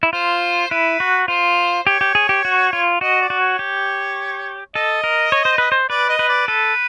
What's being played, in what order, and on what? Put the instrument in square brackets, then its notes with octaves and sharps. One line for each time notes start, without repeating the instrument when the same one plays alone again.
[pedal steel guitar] E4
[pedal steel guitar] F4 [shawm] C5
[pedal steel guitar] E4 [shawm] B4
[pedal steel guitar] F#4
[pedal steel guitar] F4 [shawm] C5
[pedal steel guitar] G4 [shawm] C#5
[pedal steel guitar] G4
G#4
G4
F#4
F4
[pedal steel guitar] F#4 [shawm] D#5
[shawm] D5
[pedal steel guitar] F#4
[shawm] C#5
[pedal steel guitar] G4
[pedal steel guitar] A4 [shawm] D#5
[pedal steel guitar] A#4
C#5
C5
B4
C5
[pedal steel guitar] B4 [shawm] D5
[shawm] D#5
[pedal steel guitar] B4
[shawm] D5
[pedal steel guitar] A4 [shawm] B4